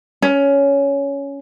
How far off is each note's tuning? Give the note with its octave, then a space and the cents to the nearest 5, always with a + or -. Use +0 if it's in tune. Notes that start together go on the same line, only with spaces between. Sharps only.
C#4 +10